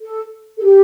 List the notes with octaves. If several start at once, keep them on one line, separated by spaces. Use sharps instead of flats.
A4
A4
G4